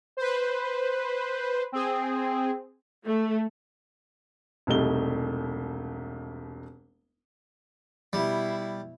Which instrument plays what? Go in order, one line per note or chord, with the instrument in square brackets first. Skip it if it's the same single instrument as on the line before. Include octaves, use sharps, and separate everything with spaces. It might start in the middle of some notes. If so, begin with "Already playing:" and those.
[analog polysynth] B4 C5
C4 G#4
[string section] A3
[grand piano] E1 C2 G3 A3 D#4 G7
[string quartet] B2 E4 [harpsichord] G3